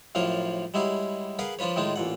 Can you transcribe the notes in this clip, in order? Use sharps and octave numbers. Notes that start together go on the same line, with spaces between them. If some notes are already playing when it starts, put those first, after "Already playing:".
F#2 A2 F3 D4 A#4 F5
G3 G#3 E4 F#4 G#4 C#5
G#4 A#4 B4 F5 F#5
F3 D4 F4 B4 C#5
A2 D#3 G#3 D#4 F4
A1 A#2 F#5